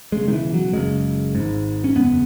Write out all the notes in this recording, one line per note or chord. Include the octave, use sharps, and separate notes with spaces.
E1 E2 C#3 G#3
D#3
E3
F#3
F#1 F#2 C#3 G#3
G#1 G#2
C#4
F#1 E2 C#3 B3